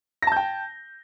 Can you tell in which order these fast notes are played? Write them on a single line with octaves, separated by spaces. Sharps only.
A#6 A5 G6 G5